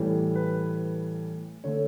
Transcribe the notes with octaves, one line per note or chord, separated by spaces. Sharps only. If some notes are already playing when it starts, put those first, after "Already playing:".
Already playing: A2 E3 G3
B4
D3 A3 C#5